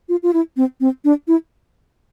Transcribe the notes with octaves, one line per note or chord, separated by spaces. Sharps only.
F4
F4
E4
C4
C4
D4
E4